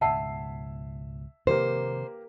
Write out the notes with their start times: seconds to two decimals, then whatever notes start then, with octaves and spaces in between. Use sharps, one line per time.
0.01 C#2 G#2 B2 E5 F#5 A5 E6 C7
1.47 C3 D#3 F3 A#3 G4 A#4 C5